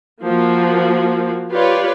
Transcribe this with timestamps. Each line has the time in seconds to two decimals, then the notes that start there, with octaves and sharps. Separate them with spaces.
0.24 F3 A#3 F#4
1.52 F4 G4 B4 C#5 D5